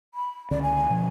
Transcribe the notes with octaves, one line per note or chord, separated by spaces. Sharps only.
B5
C#2 D3 C#4 D5
G#5
B2 F3